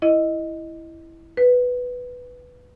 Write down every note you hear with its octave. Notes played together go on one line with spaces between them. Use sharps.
E4 D#5
B4